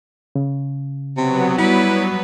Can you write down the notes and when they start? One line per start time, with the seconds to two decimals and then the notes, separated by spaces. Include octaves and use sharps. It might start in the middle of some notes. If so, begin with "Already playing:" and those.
0.36 C#3
1.17 C3 F#3 B3
1.58 G3 E4 B4 F#5